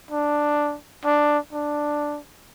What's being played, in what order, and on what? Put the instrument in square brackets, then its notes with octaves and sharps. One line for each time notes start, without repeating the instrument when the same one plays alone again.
[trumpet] D4
D4
D4